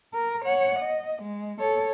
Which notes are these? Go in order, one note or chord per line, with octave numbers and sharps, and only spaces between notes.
A#4
C#5 F#5
D#5
G#3
A4 C#5